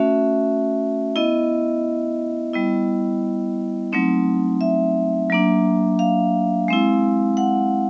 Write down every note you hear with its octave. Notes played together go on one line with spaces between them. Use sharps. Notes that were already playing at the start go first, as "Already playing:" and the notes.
Already playing: A3 C#4 F#4 E5
B3 E4 D#5
G3 B3 E4
F#3 A3 C4 D#4
E5
F#3 A#3 D4
F5
G#3 C4 E4
F#5